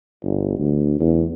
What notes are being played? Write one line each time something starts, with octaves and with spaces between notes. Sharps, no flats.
G1
D2
E2